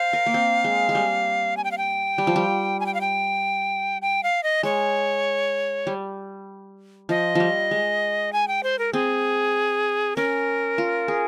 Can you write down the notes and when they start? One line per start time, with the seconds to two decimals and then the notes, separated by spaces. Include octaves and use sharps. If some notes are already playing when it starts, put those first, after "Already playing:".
Already playing: C5 F5
0.13 A#4
0.26 A#3
0.34 C4
0.64 G#3
0.89 G#3
0.95 G3
1.57 G#5
1.64 G5
1.71 F5
1.78 G5
2.18 G3
2.27 F3
2.36 G3
2.80 G#5
2.86 G5
2.94 F5
3.01 G5
4.02 G5
4.23 F5
4.43 D#5
4.63 G#3 C#5
5.87 G3
7.09 F3 D#5
7.35 F3 G3
7.71 G#3
8.33 G#5
8.48 G5
8.63 C5
8.79 A#4
8.93 C4 G#4
10.16 C#4 A#4
10.78 F4
11.08 G#4